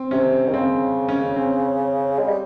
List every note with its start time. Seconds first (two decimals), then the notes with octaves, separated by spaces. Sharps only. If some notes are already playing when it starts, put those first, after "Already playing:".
Already playing: C4
0.11 C3 C#4
0.48 D#3
0.53 C#3 C4
1.08 C#4
1.36 C4
2.19 G#3
2.28 G3